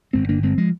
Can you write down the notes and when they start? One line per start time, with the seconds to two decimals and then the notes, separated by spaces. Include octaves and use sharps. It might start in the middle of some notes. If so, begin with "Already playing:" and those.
0.13 G1 G#3 C4
0.28 G1 A#3 D4
0.43 G1 G#3 C4
0.58 F3 G#3